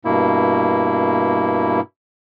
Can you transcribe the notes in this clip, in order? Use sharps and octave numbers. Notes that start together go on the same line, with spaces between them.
G2 B2 A#3 E4